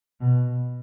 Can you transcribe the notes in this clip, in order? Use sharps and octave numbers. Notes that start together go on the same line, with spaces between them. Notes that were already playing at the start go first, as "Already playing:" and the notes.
B2